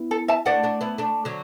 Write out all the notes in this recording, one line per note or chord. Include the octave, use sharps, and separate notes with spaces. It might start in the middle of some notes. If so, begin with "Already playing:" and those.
Already playing: B3 E4
A4
E5 A5
A3 D4 D5 F#5
A3 D4
B3 E4
A3 D4
D3 F#3